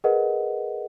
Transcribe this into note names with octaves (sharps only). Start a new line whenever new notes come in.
G#4 A#4 B4 D#5 F#5